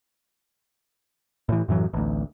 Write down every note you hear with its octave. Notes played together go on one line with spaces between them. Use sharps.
A2 E3
F#2 A2 E3 F#3
A1 D2